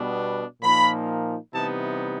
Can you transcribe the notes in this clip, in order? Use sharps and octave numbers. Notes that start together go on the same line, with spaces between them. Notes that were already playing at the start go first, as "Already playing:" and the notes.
Already playing: B2 G3 B3 D4
A#2 F3 A#3 D#4 B5
C3 E3 G3 B3 D#4 A5